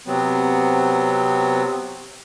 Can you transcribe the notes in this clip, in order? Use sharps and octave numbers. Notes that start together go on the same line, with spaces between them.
C3 F#3 B3 C4